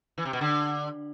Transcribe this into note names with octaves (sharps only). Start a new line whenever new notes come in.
E3
C3
B2
D3